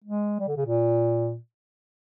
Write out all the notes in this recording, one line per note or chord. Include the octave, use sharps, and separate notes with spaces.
G#3
G3
D3
C#3
A#2